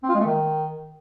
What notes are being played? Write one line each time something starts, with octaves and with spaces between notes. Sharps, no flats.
C4
F4
G#3
A3
D#3